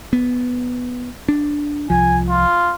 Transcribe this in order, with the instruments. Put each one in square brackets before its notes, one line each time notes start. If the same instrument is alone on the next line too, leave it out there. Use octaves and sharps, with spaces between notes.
[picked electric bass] B3
D4
[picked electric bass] C2 F3 [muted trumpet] G#5
[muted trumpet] F4